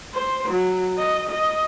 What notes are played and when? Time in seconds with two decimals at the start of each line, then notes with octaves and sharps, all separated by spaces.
0.14 C5
0.49 F#3
0.98 D#5
1.30 D#5